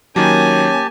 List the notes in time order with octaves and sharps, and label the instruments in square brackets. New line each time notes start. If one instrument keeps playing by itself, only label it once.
[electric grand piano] D#3 F#3 [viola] A#3 G#5 [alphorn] C#4 [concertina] G4 A5